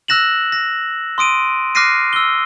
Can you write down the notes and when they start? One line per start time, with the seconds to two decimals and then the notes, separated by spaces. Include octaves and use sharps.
0.08 E6 F#6 A#6 E7 F#7
0.52 A#6
1.18 C6 D#6 D7 D#7
1.75 D6 F6 F#6 A#6 C7 D#7
2.13 E6 G7